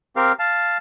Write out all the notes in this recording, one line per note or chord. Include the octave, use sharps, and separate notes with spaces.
C4 G4 A#4 F5
F5 A5